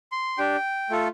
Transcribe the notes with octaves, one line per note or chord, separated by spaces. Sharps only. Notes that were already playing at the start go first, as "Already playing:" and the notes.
C6
D4 G4 G5
A3 F4 A4